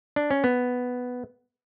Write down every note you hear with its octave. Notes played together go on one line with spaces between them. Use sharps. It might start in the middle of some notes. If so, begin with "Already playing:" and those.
D4
C#4
B3